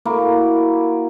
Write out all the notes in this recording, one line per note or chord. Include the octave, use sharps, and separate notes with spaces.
A#3 E4 F#4